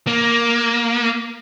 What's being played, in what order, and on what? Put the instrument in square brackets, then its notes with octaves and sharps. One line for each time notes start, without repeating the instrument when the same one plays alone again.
[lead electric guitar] A#3